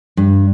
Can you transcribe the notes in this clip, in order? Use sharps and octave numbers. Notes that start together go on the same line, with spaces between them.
G2